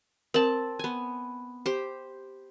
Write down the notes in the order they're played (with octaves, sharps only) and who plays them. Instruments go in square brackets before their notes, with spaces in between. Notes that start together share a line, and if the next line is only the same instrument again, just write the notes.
[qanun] C4 A5 [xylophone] A#4 F#7
[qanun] B3 G#5
G4 C5